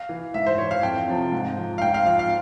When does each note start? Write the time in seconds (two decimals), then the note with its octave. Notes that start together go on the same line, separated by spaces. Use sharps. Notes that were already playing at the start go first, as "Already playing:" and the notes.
Already playing: F5
0.09 E3
0.34 G#2 E5
0.46 C5
0.58 E3 C#5
0.71 F5
0.83 F2 G5
1.08 C3 F3
1.32 G#2
1.58 F3
1.78 F5
1.82 G#2 G5
1.94 F5
2.06 F3 F5
2.19 F5